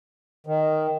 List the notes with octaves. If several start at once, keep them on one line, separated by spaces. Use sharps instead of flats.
D#3